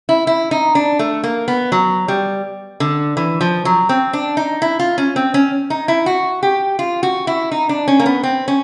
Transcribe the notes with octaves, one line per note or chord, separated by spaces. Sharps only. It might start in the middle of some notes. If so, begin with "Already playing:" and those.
E4
E4
D#4
D4
A3
A#3
B3
F#3
G3
D3
E3
F3
F#3
C4
D4
D#4
E4
F4
C#4
C4
C#4
D#4
E4
F#4
G4
F4
F#4
E4
D#4
D4
C#4
A#3
B3
C4
C#4